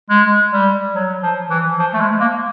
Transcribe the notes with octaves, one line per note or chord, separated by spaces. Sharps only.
G#3
G3
F#3
F3
E3
F3
A3
G#3
A#3